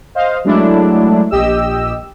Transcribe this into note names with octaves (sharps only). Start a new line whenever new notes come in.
C5 D#5 F5
F#3 G#3 A3 D4 E4
A#1 G4 D#5 E6